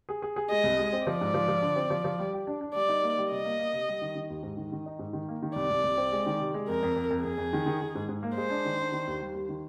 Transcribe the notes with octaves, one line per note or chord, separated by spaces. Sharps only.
G#4
G#4
G#4
G#3 D#5
C2
G#3
C4
F3 D5
G#2
F3
F3
D3
C4
F3
F3
G3
G4
D4
D4
G3 D5
D#4
A#3
G3
C3 D#5
A#3
A#3
C3
G3
D#3
D#3
D#2
G#2
D#3
D#3
D#4
G#2
D#3
A#3
D#3
C2 D5
C2
C2
C4
G#3
D#3
C3
G#3
F2 A#4
F2
F2
F2
F2 G#4
F2
D#3
D#3
D#3
G#2
G#2
A#3
G#3 C5
D4
D#3
D4
D#3
D#2
G3
D#2
D#3